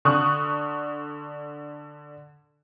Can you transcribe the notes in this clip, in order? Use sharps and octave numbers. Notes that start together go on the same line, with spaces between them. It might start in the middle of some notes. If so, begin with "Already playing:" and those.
D3 C#6 D#6 F#6